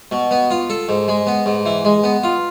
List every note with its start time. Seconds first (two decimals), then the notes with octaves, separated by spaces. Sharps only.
0.11 B2
0.31 B3
0.51 F4
0.70 A4
0.89 G#2
1.08 G#3
1.27 B3
1.46 G#2
1.66 E3
1.85 G#3
2.04 B3
2.24 F4